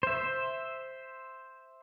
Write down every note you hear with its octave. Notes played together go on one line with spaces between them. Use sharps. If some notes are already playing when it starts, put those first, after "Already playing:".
C5 E5